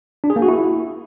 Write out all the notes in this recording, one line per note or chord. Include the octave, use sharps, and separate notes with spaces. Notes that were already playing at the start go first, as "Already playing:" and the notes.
D4
G#4
A#3
F#4
E4